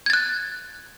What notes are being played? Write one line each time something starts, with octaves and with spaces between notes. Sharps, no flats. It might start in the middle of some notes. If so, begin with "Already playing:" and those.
F#6 G#6 A6